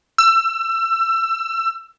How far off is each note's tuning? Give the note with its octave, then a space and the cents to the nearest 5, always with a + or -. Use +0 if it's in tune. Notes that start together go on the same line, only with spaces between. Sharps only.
E6 +25